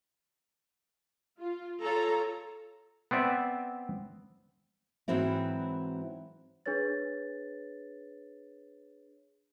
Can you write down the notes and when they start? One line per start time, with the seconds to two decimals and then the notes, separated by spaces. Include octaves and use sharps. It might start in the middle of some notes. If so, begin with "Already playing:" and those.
1.39 F4
1.81 F4 A4 C#5 A#5
3.11 B3 C4 D5 E5
5.08 G#2 E3 F#3 C4 E4
6.66 D4 G#4 B4 C#5 A6